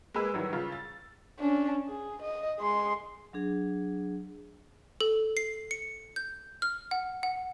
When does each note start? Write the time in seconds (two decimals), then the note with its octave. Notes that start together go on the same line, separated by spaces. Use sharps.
0.14 G#3 A#3 G#4 B4 E6
0.34 D#3 E3 F#3 G3
0.53 C#3 F4
0.72 A6
1.39 C#4 D4
1.88 G#4
2.22 D#5
2.60 G#3 C6
3.33 F#3 D4 G#4
5.01 A4
5.37 C7
5.71 C#7
6.16 G6
6.62 F6
6.91 F#5
7.23 F#5